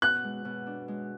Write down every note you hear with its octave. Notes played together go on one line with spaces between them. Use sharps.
B2 F#6
G#3
B2
D4
G#3